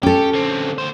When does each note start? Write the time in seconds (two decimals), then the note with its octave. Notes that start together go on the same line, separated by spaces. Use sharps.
0.03 C#4 G4 A4
0.34 D3 C4
0.78 D2 C5